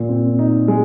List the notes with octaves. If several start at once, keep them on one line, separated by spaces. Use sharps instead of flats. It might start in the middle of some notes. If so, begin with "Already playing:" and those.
Already playing: A#2
C4
D#4
G#3